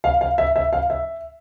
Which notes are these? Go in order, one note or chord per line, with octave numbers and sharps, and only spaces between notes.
F5
F5
E5
E5
F5
E5